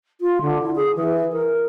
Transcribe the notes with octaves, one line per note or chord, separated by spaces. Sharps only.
F4
D3
E4
G#4
E3
A#4